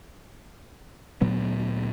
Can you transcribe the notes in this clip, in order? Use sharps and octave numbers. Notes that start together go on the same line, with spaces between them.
D2 A#2 F#3 B3